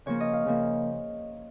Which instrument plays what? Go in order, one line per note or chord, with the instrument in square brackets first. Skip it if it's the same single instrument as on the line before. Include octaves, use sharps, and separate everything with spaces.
[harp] C#3 F3 A#3 C#5
D#5
F5
C#3 F3 A#3